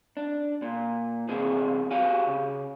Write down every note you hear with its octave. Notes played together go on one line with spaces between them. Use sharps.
D4
A#2
E2 C3 G#4
F#4 G4 F5 G#5
C#3